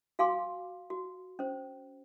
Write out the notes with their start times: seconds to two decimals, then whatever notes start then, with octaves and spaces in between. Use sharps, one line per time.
0.19 F#4 F5 G#5 C6 D6
0.90 F#4
1.39 C#4 C5